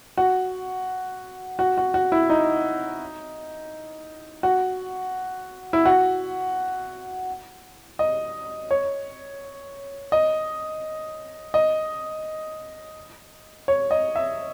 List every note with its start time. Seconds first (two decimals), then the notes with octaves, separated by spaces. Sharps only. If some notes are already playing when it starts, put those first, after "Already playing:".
0.17 F#4
1.59 F#4
1.78 F#4
1.94 F#4
2.12 E4
2.30 D#4
4.43 F#4
5.73 E4
5.85 F#4
7.99 D#5
8.71 C#5
10.12 D#5
11.54 D#5
13.68 C#5
13.91 D#5
14.16 E5